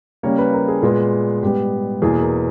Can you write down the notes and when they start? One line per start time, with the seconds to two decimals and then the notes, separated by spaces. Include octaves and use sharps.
0.23 C#3 G3 A#3 C#5
0.38 B4
0.54 A#4
0.68 G#4
0.82 A#2 G#3 B3 G#4
1.43 G#2 G3 B3 G4
2.02 E2 B2 A#3 G#4
2.22 A#4